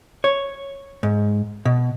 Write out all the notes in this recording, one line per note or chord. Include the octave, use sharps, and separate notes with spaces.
C#5
G#2
B2